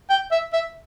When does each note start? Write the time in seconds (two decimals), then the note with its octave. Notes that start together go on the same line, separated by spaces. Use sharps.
0.10 G5
0.31 E5
0.53 E5